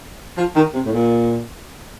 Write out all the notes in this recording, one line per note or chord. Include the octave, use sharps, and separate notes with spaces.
F3
D#3
C3
A2
A#2